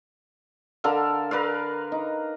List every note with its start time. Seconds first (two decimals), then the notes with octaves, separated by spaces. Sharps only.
0.84 D3 A4 A#4 F5
1.31 A#4 B4 D5 F5
1.92 D#4